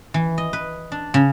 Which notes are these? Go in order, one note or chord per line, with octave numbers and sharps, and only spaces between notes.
E3
D#5
B4
D4
C#3